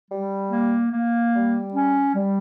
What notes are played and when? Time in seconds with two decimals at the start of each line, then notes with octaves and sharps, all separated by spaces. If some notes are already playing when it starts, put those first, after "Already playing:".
0.10 G3
0.51 A#3
0.92 A#3
1.34 G3
1.75 C#4
2.15 G3